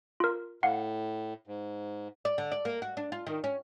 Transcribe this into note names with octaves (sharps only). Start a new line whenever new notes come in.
F4 A#4
A2 F5 F#5
G#2
D5
D3
D5
A#3
F#4
D4
F4
D#3
C#4